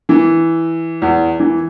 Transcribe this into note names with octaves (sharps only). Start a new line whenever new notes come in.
E3
E2
E3